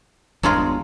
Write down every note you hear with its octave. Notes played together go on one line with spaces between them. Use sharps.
G1 E2 F#3 G#3 D4 F4